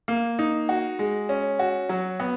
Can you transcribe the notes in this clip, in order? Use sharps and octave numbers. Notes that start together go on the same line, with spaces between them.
A#3
D#4
F#4
G#3
C#4
F#4
F#3
B3